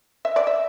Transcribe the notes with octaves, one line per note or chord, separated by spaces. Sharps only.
E5
D5
E5